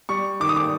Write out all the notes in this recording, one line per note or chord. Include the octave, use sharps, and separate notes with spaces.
G3 C#6
D#3 D6
D#6
D6